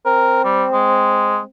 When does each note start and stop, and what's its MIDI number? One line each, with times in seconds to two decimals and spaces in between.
0.06 1.45 60
0.06 0.41 70
0.45 0.65 55
0.73 1.39 56